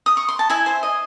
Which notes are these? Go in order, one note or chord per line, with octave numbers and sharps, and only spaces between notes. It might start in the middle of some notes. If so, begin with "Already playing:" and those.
D#6
C#6
C6
A5
E4 E5 G#5
C5
D#5